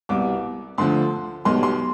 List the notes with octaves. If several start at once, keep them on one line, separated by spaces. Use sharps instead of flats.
C2 B2 G3 D6
D2 D3 F3 C6
B1 B2 G3 C6
C6